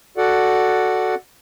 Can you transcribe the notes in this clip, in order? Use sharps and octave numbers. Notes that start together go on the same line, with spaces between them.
F#4 A4 D5 F#5